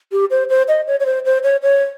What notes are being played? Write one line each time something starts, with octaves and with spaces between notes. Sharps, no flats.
G4
C5
C5
D#5
C#5
C#5
C5
C5
C#5
C#5